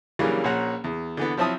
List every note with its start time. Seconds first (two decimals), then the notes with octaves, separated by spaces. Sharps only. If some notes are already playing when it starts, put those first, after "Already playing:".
0.19 C#3 E3 F#3 G3 A#3 D4
0.44 A#1 A#2 C#4 F#5 A#5
0.84 E2
1.17 D3 E3 B3
1.37 F3 F#3 C4 E4 A5 D#6